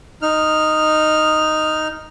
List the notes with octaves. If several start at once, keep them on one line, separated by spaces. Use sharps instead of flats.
D#4 F6